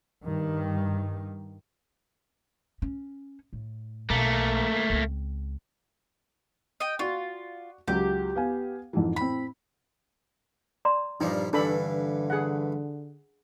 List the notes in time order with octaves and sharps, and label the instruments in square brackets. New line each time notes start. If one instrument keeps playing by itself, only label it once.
[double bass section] G2 D#3
[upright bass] C#4
A2
[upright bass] B1 [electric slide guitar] A3 A#3
[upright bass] C#2 C4
[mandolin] D#5 G5
[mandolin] F4 [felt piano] F#4 D5 C#6
[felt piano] C#2 F#3 [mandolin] G4
[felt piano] B3 F5 G#5
F2 G#2 E3
[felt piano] A2 C4 [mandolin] B5
[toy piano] D5 A#5 C6
[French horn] G2 [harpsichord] A#2 F3 G3 [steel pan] D#4
[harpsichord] G2 E3 [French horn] D3 [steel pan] D4 A4 B5
[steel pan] G#4 F#5